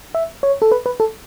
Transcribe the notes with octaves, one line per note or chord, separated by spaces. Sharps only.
E5
C#5
A4
B4
B4
A4